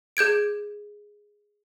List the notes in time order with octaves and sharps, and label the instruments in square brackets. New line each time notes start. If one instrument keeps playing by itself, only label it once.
[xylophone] G#4 G6 G#6 D7